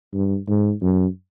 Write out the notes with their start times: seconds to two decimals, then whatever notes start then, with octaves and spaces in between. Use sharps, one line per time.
0.14 G2
0.48 G#2
0.82 F#2